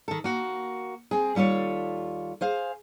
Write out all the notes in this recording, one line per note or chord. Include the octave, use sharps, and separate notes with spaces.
D#3 A4
A#3 F#4
C4 G#4
D#2 G3 F4 A4 C#5
G#4 C5 F5